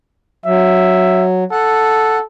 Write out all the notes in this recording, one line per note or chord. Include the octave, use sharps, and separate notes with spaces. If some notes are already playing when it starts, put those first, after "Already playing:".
F#3 E5
A4 F#5